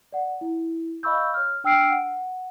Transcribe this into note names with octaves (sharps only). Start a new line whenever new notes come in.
D5 F#5
E4
D#5 F5 B5 C#6 E6 G6
C#5 F6
D4 G5 E6 F6 C7 D7
F#5